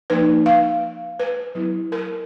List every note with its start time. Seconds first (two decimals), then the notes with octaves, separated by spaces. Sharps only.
0.10 F3 A#3 D#4 B4
0.46 F5
1.20 B4
1.55 F#3 B3 E4
1.92 A#4